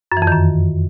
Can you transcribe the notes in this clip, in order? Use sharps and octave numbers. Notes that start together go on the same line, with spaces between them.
F#2
E3
F2
D#3
F#2